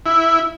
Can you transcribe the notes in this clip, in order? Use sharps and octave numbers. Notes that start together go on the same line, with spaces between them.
E4